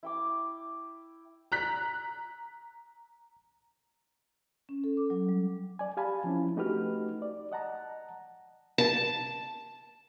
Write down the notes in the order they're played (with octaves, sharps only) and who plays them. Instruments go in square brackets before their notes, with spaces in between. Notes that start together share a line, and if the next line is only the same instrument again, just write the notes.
[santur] E4 G5 D6
[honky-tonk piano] A#5 F#6 B6
[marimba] C#4
A4
D6
F#3
G3
[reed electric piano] D5 G#5
G4 F5 G#5 A5 B5
F3 C4 C#4 E4
A3 D#4 F#4 G4 B4 F6
D5
D#5 F#5 A5 A#5
[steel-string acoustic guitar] A5